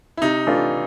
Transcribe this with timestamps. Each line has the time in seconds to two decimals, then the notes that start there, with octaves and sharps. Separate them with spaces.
0.17 E4
0.22 C3 D#4
0.47 E3 A3 D4 F4